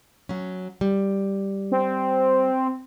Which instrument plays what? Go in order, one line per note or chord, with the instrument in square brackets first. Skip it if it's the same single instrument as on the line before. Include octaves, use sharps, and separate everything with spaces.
[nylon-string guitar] F#3 C#4
G3
[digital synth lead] C4